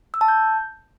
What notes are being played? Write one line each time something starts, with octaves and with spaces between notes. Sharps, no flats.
E6
A5
G6